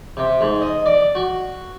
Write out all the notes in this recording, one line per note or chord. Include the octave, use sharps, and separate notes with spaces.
C3
G#2
D#5
D5
F#4